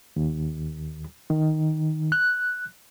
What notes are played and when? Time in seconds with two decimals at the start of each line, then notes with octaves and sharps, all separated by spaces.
0.16 D#2
1.30 D#3
2.12 F#6